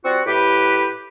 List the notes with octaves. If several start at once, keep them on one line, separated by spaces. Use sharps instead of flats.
G3 C4 F4 F#4
A2 G4 B4